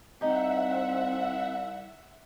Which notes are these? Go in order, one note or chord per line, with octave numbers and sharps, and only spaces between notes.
C2 C4 D#4 G4 E5 F#5